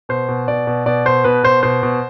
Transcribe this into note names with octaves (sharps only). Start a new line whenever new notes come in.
B2 C5
B2
B2 D5
B2
B2 D5
B2 C5
B2 B4
B2 C5
B2 C5
B2